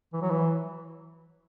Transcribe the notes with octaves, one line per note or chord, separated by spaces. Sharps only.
E3
F#3
E3